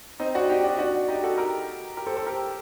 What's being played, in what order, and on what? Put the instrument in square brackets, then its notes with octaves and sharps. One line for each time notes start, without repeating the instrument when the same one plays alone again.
[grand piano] C4 D#4
D4 F#4
D#4 G4
D4 F#4
D4 F#4
D#4 G4
F#4 A4
G4 A#4
G4 A#4
A4 C5
A4 C5
G4 A#4